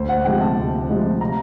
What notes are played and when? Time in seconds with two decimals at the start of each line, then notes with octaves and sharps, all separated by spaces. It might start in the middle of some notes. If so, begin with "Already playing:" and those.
Already playing: D2 C5
0.09 F#5
0.25 C3 F3 G#3 G5
0.41 A5
0.57 D2
0.89 C3 F3 G#3
1.21 A#5